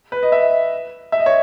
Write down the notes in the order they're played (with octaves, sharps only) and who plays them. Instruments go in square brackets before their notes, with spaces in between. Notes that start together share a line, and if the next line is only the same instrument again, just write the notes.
[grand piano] B4
D#5
E5
E5
D#5
C#5